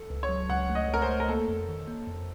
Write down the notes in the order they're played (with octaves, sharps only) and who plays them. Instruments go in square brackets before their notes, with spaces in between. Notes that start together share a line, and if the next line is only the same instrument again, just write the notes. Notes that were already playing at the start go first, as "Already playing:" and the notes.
Already playing: [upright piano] A4
[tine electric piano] C#2
[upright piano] C#5
[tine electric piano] F#3
[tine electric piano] C#2 [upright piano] F#5
[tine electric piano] A3
[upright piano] D#5
[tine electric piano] C#2 [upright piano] A#4
[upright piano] C5
[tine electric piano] A3
[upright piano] A#4
[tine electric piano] A#3 [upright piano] A4
[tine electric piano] F2
D#3
A#3
F2